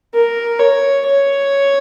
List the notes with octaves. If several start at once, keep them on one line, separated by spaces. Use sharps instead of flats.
A#4
C#5
C#5